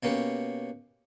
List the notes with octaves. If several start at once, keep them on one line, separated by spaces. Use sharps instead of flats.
B2 A#3 C#4 G4 B4